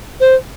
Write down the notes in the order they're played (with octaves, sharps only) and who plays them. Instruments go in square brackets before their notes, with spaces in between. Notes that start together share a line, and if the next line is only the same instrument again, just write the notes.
[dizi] C5